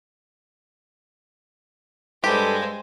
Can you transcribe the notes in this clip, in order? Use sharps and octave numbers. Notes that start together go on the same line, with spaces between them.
G2 G#3 G4 A4 B4 C5